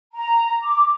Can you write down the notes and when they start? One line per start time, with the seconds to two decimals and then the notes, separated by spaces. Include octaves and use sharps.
0.13 A#5
0.63 D6